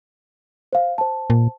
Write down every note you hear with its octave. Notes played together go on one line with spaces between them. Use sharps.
C5 F5
C5 A5
A#2